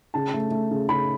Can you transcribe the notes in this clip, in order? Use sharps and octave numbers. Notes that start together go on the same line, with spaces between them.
C#3 A5
A3
A3
C#3
C#3 B5